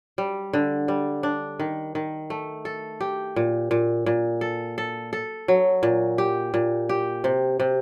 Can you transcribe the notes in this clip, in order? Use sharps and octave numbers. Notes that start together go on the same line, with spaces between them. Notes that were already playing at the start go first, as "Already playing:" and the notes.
G3
D3
G3
D4
D#3
D#3
A3
A4
G4
A#2
A#2
A#2
A4
A4
A4
F#3
A#2
G4
A#2
G4
C3
C3